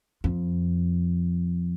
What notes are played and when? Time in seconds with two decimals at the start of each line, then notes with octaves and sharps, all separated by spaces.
0.24 F2